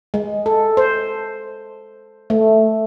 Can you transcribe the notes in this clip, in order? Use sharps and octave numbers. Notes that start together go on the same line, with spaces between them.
G#3
A4
C5
A3